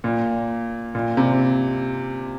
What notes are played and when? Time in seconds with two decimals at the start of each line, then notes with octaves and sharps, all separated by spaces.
0.04 A#2
0.95 A#2
1.17 C3